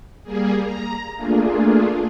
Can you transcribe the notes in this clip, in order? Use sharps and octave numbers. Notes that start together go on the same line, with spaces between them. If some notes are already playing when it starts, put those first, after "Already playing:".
G3 A#3 G#4
A#5
A3 A#3 D4 F4 G#4